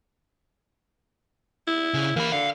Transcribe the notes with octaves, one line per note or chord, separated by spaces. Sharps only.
E4
C#3
E3 A#3 B5
D3 F5